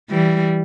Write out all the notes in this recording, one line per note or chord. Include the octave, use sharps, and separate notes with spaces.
E3 G3